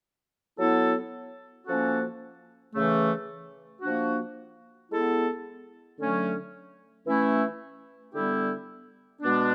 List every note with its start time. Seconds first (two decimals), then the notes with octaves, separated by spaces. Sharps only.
0.57 F#3 B3 E4 A4
1.66 F3 A#3 C#4 F#4 A4
2.73 C#3 E3 A3
3.81 F3 A#3 D4 F#4
4.90 G#3 B3 E4 A4
5.98 D3 F#3 A3 C#4
7.06 E3 A3 C#4 E4
8.13 D3 G3 B3 E4 G4
9.21 B2 G#3 B3 D4